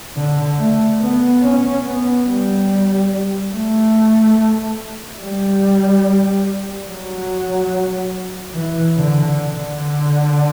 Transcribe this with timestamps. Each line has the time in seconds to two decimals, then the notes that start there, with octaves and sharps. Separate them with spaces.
0.16 D3
0.57 A3
1.00 B3
1.42 C#4
1.83 B3
2.26 G3
3.51 A3
5.20 G3
6.88 F#3
8.55 E3
8.97 D3
9.39 D3